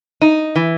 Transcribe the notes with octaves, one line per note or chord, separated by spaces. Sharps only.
D#4
E3